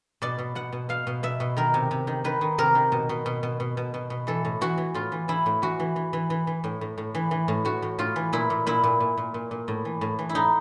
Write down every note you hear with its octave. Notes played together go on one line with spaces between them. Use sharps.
B2 D5
B2
B2 F#5
B2
B2 F5
B2
B2 E5
B2
D#3 A#4
C3
C3
D#3
D#3 B4
D#3
C3 A#4
D#3
B2
B2
B2
B2
B2
B2
B2
B2
E3 A4
A2
E3 F#4
E3
A2 F4
E3
E3 E4
A2
E3 F#4
E3
E3
E3
E3
E3
A2
A2
A2
E3
E3
A2
A2 F#4
A2
A2 F4
E3
A#2 E4
A#2
A#2 E4
A#2
A#2
A#2
A#2
A#2
A2
E3
A2
E3
E4
A2 D#4